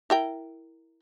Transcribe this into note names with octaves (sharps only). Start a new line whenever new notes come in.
E4 A#4 G5